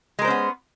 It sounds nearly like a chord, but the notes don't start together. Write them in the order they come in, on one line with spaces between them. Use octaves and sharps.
G#3 A#4 C5 C#4 B3